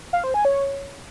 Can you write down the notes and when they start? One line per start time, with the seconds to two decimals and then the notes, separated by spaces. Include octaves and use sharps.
0.13 F5
0.24 C5
0.34 G#5
0.45 C#5